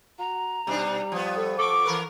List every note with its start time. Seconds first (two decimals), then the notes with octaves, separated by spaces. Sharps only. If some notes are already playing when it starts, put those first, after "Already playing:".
0.19 F#4 A#5
0.67 B2 G3 D4 D#4
1.12 F3 B3
1.36 A4
1.59 A4 C#6 D6
1.85 E3 A#4 B4